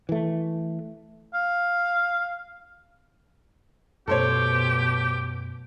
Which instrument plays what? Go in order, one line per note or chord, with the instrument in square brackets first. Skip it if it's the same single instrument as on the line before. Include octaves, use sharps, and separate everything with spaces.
[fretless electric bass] E3 A3
[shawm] F5
[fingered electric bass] F#2 A3 [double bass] B2 [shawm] G4 [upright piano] A4 C5 C#5